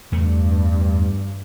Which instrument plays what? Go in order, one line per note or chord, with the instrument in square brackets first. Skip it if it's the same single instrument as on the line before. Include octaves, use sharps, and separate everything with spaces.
[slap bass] E2 A3 [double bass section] G2